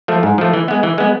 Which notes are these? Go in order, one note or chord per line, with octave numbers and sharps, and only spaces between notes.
F3 A3
G#2
F3 A3
E3
G#3 B3
E3
G#3 B3